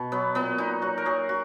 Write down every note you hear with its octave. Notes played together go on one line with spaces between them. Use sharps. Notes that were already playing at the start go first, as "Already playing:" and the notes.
Already playing: B2
F#3 B3
A#2 B3
A#2 D#4
F#3 F#4
A#4
F#3 G#4
F#4